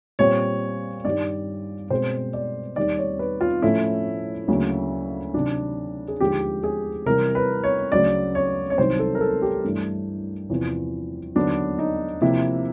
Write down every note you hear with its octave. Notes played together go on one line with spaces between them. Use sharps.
A#2 G3 C4 C#5
G2 D#3 G3 D5
B2 G#3 C4 C5
D5
D#2 D#3 G3 D5
C#5
B4
F4
A2 F3 A3 C#4 E4
D2 C#3 F#3 A#3
C3 D#3 F#3 D4
G#4
D#2 D3 F3 G#3 G4
G#4
C3 E3 G3 A#4
B4
C#5
D2 C#3 F#3 D5
C#5
C#5
C2 C3 D#3 F#3 C5
A4
A#4
A4
G4
G2 E3 A3 D4
E2 C3 F3
D#2 D3 F#3 B3 D4
D#4
C3 F3 A#3 E4